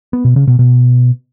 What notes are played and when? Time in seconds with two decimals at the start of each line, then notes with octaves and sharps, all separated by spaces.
0.13 B3
0.25 B2
0.36 C#3
0.47 B2
0.59 B2